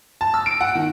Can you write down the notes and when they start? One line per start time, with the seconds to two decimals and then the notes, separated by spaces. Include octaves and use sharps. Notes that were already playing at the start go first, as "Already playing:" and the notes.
0.21 A5
0.34 E6
0.46 D7
0.61 F#5
0.75 D#3